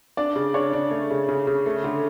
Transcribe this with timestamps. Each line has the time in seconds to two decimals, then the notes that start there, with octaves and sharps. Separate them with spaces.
0.17 D4 D5
0.36 C#3
0.54 D4 C#5
0.73 D4
0.91 A3
1.11 C#3
1.29 C#3
1.47 C#3
1.66 A3
1.84 D3